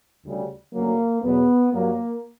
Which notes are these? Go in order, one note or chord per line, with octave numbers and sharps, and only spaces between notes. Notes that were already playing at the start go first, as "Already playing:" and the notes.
D2 C#3 G3
D2 C#3 F#3 A#3
E2 B2 F#3 B3
G2 F#3 A#3